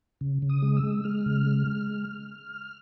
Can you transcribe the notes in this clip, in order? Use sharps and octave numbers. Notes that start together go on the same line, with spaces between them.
C#3
C#3
D#6
G#3
E6
G#3
G#3 F6
C#3
G#3
G#3